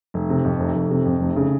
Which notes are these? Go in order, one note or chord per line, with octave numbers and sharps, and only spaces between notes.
F1
C3
F2
F1
F1
C3
F2
F1
C#3